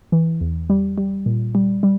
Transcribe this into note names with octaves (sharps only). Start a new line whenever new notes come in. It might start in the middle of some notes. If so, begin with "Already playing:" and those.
E3
E2
G3
G3
A#2
G3
G3